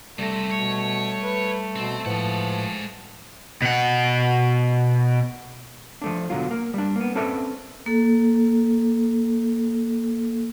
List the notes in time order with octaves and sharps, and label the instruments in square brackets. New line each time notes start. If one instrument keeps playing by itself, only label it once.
[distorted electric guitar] C3 [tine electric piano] G3 A#6 [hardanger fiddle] A3
[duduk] B2 [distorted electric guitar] C#5
[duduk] B4
[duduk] B2 [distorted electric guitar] C4
[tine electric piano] A2 B4 C5 [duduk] F3 [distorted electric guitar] G#3 F#5
[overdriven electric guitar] B2 F#5
[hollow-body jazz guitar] F3 A3 D4
B2 D3 F#3 F4
A#3
G3 D4
A#3 B3
C4 C#4 A4 B4 D5 E5
[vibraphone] A#3 A4